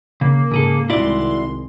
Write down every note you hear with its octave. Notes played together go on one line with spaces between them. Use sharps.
C#3 A#3
G#2 C#3 G#4 A4
C2 D#3 G#3 E4 F#4 D5 C6